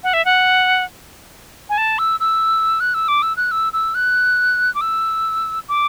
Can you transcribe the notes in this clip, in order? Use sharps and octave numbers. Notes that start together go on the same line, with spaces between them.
F#5
E5
F#5
G#5
A5
E6
E6
F#6
E6
D6
E6
F#6
E6
E6
F#6
D6
E6
D6